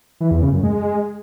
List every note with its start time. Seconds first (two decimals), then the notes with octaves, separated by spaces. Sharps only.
0.20 E3
0.31 E2
0.42 C#3
0.53 F#2
0.63 G#3